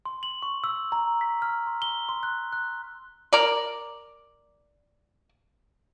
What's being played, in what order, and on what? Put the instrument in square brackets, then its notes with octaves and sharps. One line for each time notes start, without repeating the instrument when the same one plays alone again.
[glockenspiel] C6
F#7
C#6
E6
A#5
B6
F6
C6
G7
C6
F#6
F#6
[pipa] A#4 D5